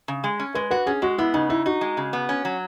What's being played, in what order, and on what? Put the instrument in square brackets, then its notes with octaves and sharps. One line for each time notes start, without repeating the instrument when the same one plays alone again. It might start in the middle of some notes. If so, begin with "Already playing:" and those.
[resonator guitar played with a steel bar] C#3
G#3
C#4
[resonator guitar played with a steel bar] G#3 [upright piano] B4
[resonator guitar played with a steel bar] F#4 [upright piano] B4
[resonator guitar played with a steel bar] C#4 [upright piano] G#4
[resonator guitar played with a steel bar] G#3 [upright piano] F#4
[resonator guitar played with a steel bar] B3 [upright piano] E4
[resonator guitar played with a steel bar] C#3 [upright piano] D#4
[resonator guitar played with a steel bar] D#4 [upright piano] E4
[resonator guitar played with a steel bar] D#4 [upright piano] F#4
[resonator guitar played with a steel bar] G#3
C#3
B3
C#4
F#3